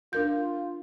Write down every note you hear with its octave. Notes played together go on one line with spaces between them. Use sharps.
D4 F4 A#4 G6